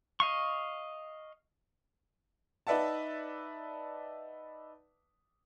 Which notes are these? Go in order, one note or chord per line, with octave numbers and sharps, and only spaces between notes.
D#5 F5 C#6
D#4 B4 D5 E5 F#5 A5